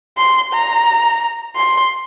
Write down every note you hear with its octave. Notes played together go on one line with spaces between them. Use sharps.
C6
A#5
C6